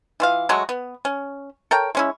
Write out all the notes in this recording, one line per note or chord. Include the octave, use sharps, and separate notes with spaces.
E3 F4 F5
F#3 G#3 A3 F#4
B3
C#4
A4 A#4 C#5 G5
G#3 C#4 E4